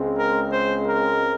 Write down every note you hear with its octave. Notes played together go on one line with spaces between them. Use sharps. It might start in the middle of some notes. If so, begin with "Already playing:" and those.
Already playing: C#2 C#3 G#3 C4
A#4
C5
A#4